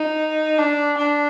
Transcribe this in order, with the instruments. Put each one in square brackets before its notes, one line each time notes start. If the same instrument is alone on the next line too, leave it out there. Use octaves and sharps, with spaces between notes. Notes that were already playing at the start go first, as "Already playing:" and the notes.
Already playing: [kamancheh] D#4
D4
D4